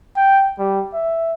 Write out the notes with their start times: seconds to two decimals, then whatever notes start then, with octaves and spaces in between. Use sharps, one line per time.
0.17 G5
0.59 G3
0.94 E5